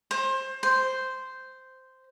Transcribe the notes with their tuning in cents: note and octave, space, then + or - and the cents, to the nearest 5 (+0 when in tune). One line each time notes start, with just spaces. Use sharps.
C5 +25
C5 -5